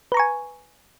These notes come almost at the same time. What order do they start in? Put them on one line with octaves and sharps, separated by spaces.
B4 A#5 C#6 G#5